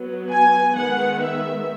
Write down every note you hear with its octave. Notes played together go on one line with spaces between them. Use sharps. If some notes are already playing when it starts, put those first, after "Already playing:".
Already playing: F#3 B3
G#5
D#3 G#3 B3 F#5
E5